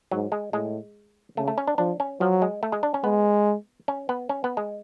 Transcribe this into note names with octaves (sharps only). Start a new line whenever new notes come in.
G#2 F#3
G#3
A2 G#3
C#3 A3
A3
C#4
D4
F3 D4
C#4
F3 F#3
G#3
A3
G#3
D4
C#4
G#3 B3
C#4
B3
C#4
B3
G#3